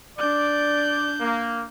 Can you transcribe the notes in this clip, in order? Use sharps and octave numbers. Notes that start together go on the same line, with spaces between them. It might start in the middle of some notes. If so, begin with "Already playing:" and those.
D4 D5 G6
A#3